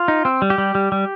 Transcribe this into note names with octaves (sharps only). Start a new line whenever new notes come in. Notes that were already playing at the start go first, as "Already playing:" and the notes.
Already playing: F4
D#4
C4
G3
G4
G3
G3
G3